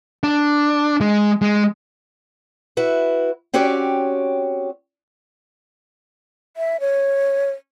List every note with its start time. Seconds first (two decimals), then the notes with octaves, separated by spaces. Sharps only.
0.23 D4
1.01 G#3
1.42 G#3
2.77 E4 F#4 B4
3.54 C4 C#4 F#4 G4 C#5 D5
6.57 E5
6.80 C#5